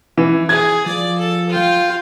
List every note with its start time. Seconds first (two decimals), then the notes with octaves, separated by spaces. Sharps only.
0.18 E3
0.49 G#4 G#6
0.86 F3 D5
1.19 A4
1.50 F4 G5